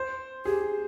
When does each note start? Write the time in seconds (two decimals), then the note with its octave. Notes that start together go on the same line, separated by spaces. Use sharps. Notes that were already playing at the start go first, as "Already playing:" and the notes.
Already playing: C5
0.45 G4 G#4